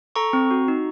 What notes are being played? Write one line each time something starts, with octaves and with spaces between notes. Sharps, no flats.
A4 A#5 C#6
C4
F#4
D#4